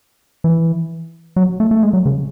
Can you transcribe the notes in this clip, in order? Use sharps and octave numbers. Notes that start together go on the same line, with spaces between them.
E3
F#3
A3
A3
G#3
F#3
C#3